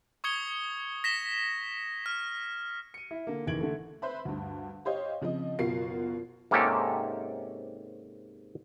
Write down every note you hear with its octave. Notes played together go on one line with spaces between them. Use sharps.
C#6 D#6 G#6 C#7 G7
A#6 B6 E7 G7
F6
C#7 D#7
E4
D3 A#3
F#1 D#3 E3 G#6 D7 F#7
D3 A3
B4 C5 E5 B5
D2 G2
G4 C5 C#5 D#5 F5
C#3 F3 C4 D#5
F#1 B2 F4 F#4 A#4 C7
G#2 C3 A#3 C#4 G4 A4